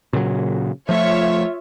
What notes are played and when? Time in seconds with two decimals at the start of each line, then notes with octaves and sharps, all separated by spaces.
0.13 A#2 C#3 F#3
0.89 F3 A3 F4 C#5 E5